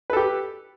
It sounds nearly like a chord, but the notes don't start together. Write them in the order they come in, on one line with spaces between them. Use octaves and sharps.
B4 A4 G4